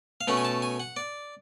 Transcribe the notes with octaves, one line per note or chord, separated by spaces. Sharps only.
F5
B2 A3 C#4 F#5
G#5
A5
G#5
F#5
D5